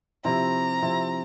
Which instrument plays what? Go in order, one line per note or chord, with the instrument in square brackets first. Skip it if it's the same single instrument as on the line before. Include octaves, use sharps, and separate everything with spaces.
[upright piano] C3 F3 C4 E4 [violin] A#5
[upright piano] C3 F3 C4 E4